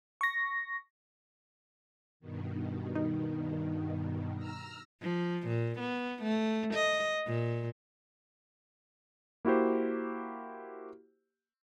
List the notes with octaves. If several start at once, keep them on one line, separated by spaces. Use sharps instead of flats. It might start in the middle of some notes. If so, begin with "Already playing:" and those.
C#6 A#6
G2 B2 D#3
D#4
A#5 E6 F6
F3
A#2
B3
A3
D#5
A#2
A#3 E4 F#4 G4 C5